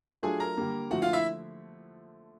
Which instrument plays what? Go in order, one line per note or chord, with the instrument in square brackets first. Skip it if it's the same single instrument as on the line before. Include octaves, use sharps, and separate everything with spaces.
[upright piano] F#3 A3 D4 F4 A4 [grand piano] G#4 G#5
[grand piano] A#4 A#5
[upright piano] D3 G3 A#3
[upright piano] D3 F3 A3 [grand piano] F#4 F#5
[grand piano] F4 F5
E4 E5